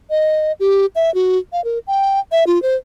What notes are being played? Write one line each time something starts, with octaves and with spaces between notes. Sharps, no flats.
D#5
G4
E5
F#4
F5
A#4
G5
E5
F4
C5